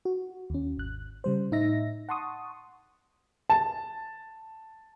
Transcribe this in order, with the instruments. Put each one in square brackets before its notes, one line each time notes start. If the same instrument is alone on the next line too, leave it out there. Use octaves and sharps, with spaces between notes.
[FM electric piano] F#4
D#2 C#4
G#1 F#6
C#3 G3 C5
A2 D#4 E5 A#6
F#5 A5 C6 C#6 D#6
[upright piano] A5